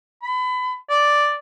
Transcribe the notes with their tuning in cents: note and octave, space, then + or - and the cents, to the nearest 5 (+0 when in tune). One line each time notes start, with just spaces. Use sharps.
B5 +30
D5 +0